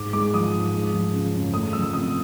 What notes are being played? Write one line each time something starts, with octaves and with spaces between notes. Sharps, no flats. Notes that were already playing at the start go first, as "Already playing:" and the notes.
Already playing: G#2 D6
G#3 D6
F3 D#6
G#2
G#3
F3
C#3
F#2
A3 D#6
F3 E6
C3 D#6